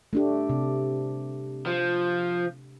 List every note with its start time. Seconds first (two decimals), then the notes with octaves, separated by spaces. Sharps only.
0.13 A3 D4 G4
0.49 C3
1.66 F3